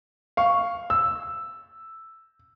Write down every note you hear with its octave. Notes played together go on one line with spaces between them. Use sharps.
F5 C#6
E6